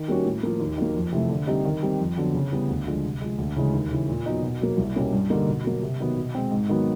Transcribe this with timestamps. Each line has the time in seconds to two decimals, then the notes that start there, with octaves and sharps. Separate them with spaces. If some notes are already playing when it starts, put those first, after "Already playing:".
Already playing: D#3
0.08 G3 A#3 C#4 F#4
0.25 A2
0.43 F3 A#3
0.60 D#2
0.78 D#3 F#3 A#3
0.95 F2
1.12 C3 E3 A3
1.29 D3
1.47 G3 C4 D#4 G4
1.65 D#3
1.83 G3 C4
1.99 F2
2.17 D3 F#3 B3 D4
2.34 C#3
2.52 E3 G3 B3
2.69 D2
2.87 D3 F3 G#3
3.04 C3
3.21 F3 G#3
3.38 D2
3.56 C#3 E3 G#3
3.73 D#2
3.91 C#3 E3
4.08 A#2
4.26 F#3 B3 D#4
4.43 B2
4.61 F#3 A#3
4.77 C2
4.96 B2 G3 A#3 C#4
5.13 G2
5.30 D3 G3 A#3 D#4
5.48 B2
5.64 F#3 A#3
5.82 C3
6.00 D#3 F#3 B3
6.17 B2
6.35 G#3 C4
6.52 G#2
6.69 D#3 F#3 B3